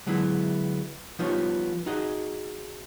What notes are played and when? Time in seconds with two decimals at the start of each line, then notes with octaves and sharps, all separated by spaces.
0.07 D3 F#3 G#3 B3 E4
1.19 F3 G3 B3 D#4 F4 C#5
1.86 D#4 F#4 G#4 D#5